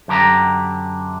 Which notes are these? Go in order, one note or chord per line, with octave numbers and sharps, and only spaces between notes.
F#2 D3 G4 A#5